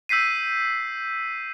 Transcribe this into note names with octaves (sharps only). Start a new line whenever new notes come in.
E6 G6 B6 C7 D#7